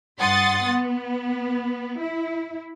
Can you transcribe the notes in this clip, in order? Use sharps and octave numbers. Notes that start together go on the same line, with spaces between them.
G2 F#5 C6 D#6 A6
B3
E4